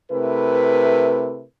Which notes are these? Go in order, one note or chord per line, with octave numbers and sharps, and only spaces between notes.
C3 A3 E4 A#4 B4